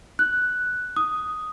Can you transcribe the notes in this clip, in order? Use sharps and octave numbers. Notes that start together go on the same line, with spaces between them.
F#6
D#6